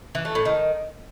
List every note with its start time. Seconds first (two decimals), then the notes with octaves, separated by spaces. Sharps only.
0.15 E3
0.25 A3
0.35 A2
0.45 D#3